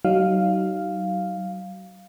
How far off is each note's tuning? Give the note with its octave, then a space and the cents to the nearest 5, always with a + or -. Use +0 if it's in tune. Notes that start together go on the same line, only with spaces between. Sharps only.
F#3 +40 D#4 +0 F5 +0